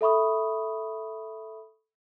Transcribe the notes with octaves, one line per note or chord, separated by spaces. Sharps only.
A4 E5 B5 C#6 D#6